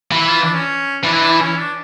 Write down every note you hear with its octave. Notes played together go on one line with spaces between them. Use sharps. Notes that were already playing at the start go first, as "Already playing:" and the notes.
E3
E4
F4
D4
C#4
E3 D4
E4
D4
E4
C#4
D4